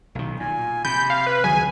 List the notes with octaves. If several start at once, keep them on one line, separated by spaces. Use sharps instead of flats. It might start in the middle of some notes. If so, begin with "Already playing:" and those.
B1 D#3
A#2 G#5
C3 B5 G6
F5
B4
C#2 D#3 F#3 G#4 G#5